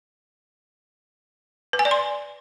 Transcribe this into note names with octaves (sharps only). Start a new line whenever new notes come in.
B4
G#5
D5
C6